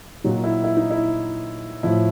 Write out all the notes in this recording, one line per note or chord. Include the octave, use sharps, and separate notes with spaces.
A#2 F#3 D#4
E4
E4
D#4
E4
A2 F3 E4